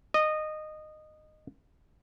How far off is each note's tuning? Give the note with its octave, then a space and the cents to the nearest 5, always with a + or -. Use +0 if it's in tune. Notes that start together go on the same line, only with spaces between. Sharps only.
D#5 -15